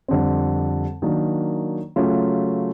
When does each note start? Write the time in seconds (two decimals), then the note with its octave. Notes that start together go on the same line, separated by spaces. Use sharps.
0.08 F2 D3 G3 C4
1.02 D#3 F#3 A#3 D4
1.96 C#3 F#3 A3 C#4 F4